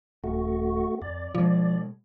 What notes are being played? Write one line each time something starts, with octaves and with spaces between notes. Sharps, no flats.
D#1 A3 F#4
F2 D5
B2 F3 G#3